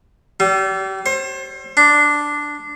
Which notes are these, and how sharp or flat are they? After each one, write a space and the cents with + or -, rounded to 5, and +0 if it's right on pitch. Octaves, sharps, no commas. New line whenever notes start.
G3 -35
C5 +35
D4 +0